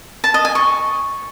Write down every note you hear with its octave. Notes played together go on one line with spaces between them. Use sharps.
A5
D#5
G#5
C#6